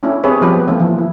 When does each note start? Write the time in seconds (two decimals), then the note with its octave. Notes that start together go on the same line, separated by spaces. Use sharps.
0.03 A3 C#4 D4 E4
0.24 B3 C4 G4 G#4 B4 C#5
0.41 F3 G3 B3 C4 G4 B4
0.67 D#3 E3 A3 A#3 C4
0.80 E3 F3
0.98 E4